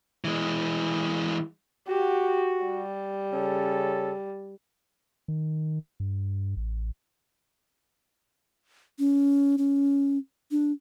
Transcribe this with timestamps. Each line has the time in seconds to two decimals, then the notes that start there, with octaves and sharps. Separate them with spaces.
0.24 E3 G#3
1.88 F#4 G4
2.65 G3
3.33 C#3 C#4 A4
5.28 D#3
6.00 G2
6.57 A1
8.99 C#4
9.58 C#4
10.51 D4